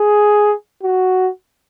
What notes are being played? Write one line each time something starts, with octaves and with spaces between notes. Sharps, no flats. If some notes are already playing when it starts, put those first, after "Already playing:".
Already playing: G#4
F#4